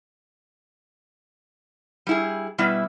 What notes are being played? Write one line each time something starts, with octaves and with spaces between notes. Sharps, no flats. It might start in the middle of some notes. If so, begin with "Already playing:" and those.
G3 E4 G#4
B2 G3 B3 E4 E5